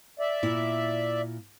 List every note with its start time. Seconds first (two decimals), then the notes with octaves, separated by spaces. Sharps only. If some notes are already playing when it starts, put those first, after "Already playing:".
0.19 D5 E5
0.43 A#2 E4